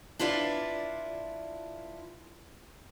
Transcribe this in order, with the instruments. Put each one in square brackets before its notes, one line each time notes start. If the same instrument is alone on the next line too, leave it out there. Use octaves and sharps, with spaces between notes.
[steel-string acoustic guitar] D4 E4 F4 B4 D5